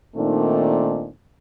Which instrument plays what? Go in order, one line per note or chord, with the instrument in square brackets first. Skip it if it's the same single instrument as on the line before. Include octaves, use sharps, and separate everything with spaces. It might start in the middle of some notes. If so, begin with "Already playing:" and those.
[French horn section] A#2 D#3 A3 C4 D4 D#4